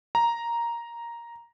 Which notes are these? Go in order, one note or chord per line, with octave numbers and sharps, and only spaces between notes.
A#5